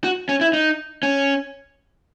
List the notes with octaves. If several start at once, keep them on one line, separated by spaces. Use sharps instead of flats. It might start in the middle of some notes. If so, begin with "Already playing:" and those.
F#4
C#4
E4
D#4
C#4